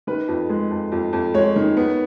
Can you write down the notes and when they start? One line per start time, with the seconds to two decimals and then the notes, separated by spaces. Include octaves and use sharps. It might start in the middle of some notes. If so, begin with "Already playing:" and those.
0.07 D#3 B4
0.28 F2
0.49 G#3
0.71 F2
0.92 F2
1.13 F2
1.34 G#3 C#5
1.56 D#3
1.77 B3